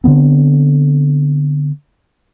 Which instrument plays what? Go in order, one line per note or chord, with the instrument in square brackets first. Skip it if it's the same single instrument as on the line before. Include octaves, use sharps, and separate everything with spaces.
[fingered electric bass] D3 D#3 B3 C4